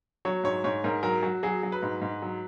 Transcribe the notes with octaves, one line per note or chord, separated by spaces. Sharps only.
F#3 C#5
G#2 C#5
G#2 C#5
G#2 A#4
F#3 A#4
F#3 F#4
F#3 G#4
F#3
B4
G#2
G#2
F#3